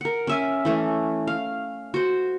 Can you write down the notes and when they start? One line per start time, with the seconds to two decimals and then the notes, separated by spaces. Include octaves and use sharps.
0.01 A#4 F#5
0.27 C#4 E5 G#5
0.65 E3 A3 C#4
1.27 F5
1.94 F#4 C5